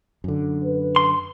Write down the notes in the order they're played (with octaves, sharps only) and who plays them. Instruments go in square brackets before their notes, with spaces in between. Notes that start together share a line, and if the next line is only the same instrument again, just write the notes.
[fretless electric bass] F#2 D3
[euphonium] B4
[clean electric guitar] C6